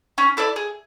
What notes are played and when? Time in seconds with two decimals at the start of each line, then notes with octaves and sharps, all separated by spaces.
0.18 C#4
0.37 E4 A4 D5
0.56 G#4